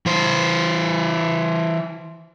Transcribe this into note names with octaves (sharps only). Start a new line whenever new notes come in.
E3 C5